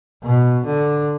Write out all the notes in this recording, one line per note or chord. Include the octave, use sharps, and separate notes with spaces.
B2
D3